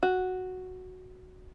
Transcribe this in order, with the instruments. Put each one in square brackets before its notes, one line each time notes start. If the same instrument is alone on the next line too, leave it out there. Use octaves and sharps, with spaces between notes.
[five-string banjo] F#4